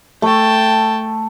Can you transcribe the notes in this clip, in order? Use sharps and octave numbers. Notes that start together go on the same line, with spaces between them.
A3 G5 A5